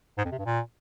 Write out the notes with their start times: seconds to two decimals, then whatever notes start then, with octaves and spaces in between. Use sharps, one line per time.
0.18 G#2
0.25 F2
0.32 C3
0.39 G2
0.46 A#2